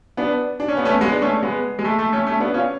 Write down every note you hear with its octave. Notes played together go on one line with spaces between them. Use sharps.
B3 D4
D4
C#4
B3
A3 C#4
G#3 B3
D4
A3 C#4
G#3 B3
G#3
A3
A3
A3 C#4
A3 C#4
B3 D4
C#4 F4